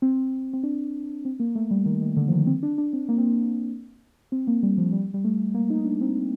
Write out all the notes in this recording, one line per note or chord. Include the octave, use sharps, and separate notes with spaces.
C4
C4
D4
C4
A#3
A3
G3
D#3
D#3
D3
F3
D#3
C4
D4
D4
C4
A#3
C4
A#3
C4
A#3
G3
F3
G3
G3
A3
A#3
D#4
D4
C4